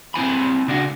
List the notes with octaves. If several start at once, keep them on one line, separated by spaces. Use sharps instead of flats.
C4 E4 G#5 B5
C#3 D4 F#4